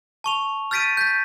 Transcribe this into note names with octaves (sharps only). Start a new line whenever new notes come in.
A5 C#6 F7
F6 G6 A6 B6 D7 D#7
G6 A6 B6